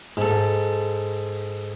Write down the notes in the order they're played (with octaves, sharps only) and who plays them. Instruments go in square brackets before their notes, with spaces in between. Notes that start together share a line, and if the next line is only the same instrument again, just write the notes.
[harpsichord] G#2 A4